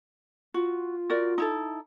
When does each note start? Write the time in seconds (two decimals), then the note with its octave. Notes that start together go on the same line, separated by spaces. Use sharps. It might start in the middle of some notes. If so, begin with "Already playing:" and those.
0.54 F4 F#4
1.10 F#4 A#4 D5
1.38 D#4 E4 A4